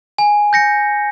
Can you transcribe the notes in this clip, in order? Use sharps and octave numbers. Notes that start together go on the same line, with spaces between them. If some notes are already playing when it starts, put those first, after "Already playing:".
G#5
G6 A#6 C#7